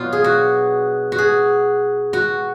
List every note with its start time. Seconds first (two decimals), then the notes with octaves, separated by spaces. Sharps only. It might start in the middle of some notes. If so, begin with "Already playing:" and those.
Already playing: B2 F#3 B3 D4 F4
0.12 G#4
0.24 F#4
1.12 F#4
1.18 G#4
2.13 F#4